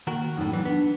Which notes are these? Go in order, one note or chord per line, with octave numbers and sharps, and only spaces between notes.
D#3 A#3 F#4 A#4
F#2 A2 D#4
E2 E3 F#3
B3 D4